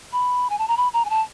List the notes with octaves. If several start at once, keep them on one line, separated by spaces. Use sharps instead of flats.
B5
G#5
A5
A#5
B5
A#5
G#5
A5